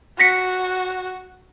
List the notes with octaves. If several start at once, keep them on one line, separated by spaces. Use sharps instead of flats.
F#4 A#6 B6 C#7